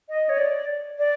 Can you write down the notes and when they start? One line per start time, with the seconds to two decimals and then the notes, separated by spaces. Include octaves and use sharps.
0.09 D#5
0.29 C#5
0.38 D5
0.98 D5